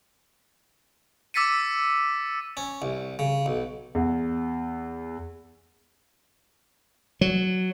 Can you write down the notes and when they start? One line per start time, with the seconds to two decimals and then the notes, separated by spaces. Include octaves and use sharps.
1.34 D6 E6 A6 B6 C#7 D#7
2.57 C#4
2.82 C2
3.19 C#3
3.46 B1
3.95 E2
7.21 F#3